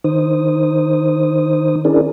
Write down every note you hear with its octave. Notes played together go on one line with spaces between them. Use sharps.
D#3 D#4 C5 D#6
C#4 D4 E4 G#4 A#4 D5